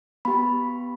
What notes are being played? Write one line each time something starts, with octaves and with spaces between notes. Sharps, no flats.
B3 G4 B5